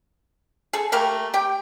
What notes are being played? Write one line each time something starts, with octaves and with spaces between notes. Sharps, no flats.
G#4 A4
A3 A#3 G4 A#4
G4 G5